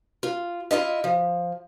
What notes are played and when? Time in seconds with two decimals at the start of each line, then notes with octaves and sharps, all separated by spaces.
0.23 F4
0.71 E4 F4 D#5 E5
1.04 F3